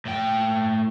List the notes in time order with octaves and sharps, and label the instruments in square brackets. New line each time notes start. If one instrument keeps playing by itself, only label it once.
[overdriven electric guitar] A2 G5